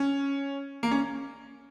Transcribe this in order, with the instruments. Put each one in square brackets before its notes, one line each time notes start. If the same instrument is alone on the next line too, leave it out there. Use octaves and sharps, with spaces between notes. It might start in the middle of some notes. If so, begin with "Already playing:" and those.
Already playing: [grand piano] C#4
A#3
C#4